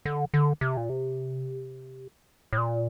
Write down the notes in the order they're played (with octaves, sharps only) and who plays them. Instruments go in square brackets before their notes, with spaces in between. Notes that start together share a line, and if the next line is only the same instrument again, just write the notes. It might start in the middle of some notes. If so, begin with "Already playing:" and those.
[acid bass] D3
D3
C3
A#2
C3
A2
A#2